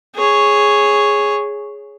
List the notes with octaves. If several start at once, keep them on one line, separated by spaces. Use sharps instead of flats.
G#4 C#5